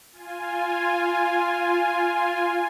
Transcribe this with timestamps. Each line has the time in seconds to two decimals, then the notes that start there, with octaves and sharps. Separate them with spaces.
0.12 F4 G#5